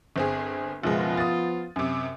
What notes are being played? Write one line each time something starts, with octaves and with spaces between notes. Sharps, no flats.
G1 C4 G#4
F#1 B2 F3 G#3 B3 F4
D#6 A6
F#2 C3